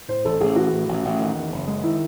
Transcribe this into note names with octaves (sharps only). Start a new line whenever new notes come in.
A2 C5
A1 A4
A1 G#4
E3 F#4
A2
A1
A1
D#3
E2
F#1
G#3
D#3 E4